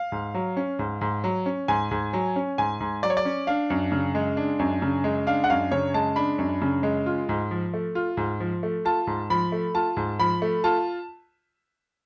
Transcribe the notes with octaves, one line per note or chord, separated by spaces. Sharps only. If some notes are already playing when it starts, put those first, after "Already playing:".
Already playing: F5
G#2
F#3
C#4
G#2
G#2
F#3
C#4
G#2 G#5
G#2
F#3
C#4
G#2 G#5
G#2
F#3 D5
C#5
D5
C#4
D4 F5
F#2
C#3
G#3
D4
F#2
C#3
G#3
D4 F5
F#5
F#2 F5
C#3 C#5
G#3 A5
D4 B5
F#2
C#3
G#3
F4
G#2
F3
A3
F4
G#2
F3
A3
F4 A5
G#2
F3 B5
A3
F4 A5
G#2
F3 B5
A3
F4 A5